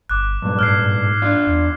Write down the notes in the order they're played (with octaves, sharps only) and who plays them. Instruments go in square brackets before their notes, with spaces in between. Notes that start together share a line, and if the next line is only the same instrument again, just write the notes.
[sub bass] G1 [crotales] D6 F#6
[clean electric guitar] G2 A#2 [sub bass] F#3
[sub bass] G#2 [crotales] F6 G#6 C7
[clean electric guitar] D4 F4
[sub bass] E2